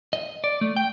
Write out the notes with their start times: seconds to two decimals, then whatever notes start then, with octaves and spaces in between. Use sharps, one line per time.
0.13 D#5
0.44 D5
0.61 A3
0.76 G5